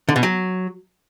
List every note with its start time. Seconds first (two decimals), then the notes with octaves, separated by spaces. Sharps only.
0.09 D3
0.16 B2
0.23 F#3